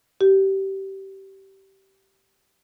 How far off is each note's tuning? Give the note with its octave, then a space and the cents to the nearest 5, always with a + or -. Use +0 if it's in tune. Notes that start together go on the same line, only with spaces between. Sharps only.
G4 -20